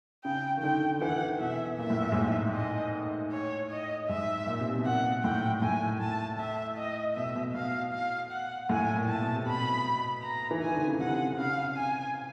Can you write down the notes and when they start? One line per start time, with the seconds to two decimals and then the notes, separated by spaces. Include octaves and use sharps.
0.24 C#3 G5
0.57 D#3
0.63 D3 G5
1.01 E3 F#5
1.40 B2 E5
1.78 A#2 E5
1.90 A2
2.02 A#2
2.12 G#2
2.16 A2
2.55 D#5
3.32 C#5
3.70 D#5
4.08 G#2 E5
4.46 A#2
4.60 C3
4.66 B2
4.78 B2
4.85 A#2 F#5
5.24 A2 G5
5.62 A2 G#5
6.01 A5
6.39 E5
6.77 D#5
7.16 B2 E5
7.35 B2
7.54 B2 F5
7.92 F5
8.31 F#5
8.69 A2 G#5
8.95 A#2
9.08 A5
9.20 B2
9.35 C3
9.46 B2 B5
10.23 A#5
10.51 E3
10.62 D#3 G#5
10.75 D3
10.88 C#3
11.00 C3 F#5
11.32 C3
11.38 C#3 F5
11.77 G#5